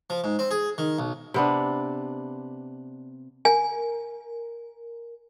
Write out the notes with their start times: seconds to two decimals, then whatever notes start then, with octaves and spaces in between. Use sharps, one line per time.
0.10 F3
0.24 G#2
0.39 C4
0.51 G#4
0.78 D#3
0.99 B1
1.34 C3 B3 D4
3.45 A#4 G#5